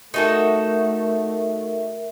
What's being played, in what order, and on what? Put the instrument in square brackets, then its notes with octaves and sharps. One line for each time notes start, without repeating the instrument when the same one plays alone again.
[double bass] A3 [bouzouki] D#4 F#4 A4 [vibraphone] A#4 E5